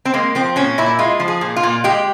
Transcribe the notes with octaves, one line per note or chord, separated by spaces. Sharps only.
C4
G#3 A#3
F3 C4
A#2 C#4
A#2 E4
G#3 F4
F3
G#4
A#2
F4
A#2
G#3 G4